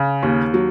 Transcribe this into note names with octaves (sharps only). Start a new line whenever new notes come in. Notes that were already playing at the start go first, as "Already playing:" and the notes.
Already playing: C#3
D#2
F#3